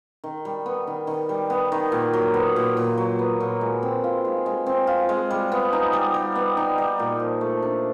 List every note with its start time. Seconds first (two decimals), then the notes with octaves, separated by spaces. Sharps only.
0.24 D#3
0.45 G3
0.66 B3
0.87 D#3
1.07 D#3
1.29 G3
1.50 B3
1.72 D#3
1.92 A#2
2.13 F#3
2.34 B3
2.56 A#2
2.77 A#2
2.98 F#3
3.19 B3
3.40 A#2
3.61 G#3
3.83 C4
4.04 F4
4.25 G#3
4.46 G#3
4.66 C4
4.87 F4
5.09 G#3
5.30 G3
5.52 B3
5.73 D#4
5.93 G3
6.14 G3
6.36 B3
6.57 D#4
6.78 G3
6.99 A#2
7.20 F3
7.41 A3
7.62 D4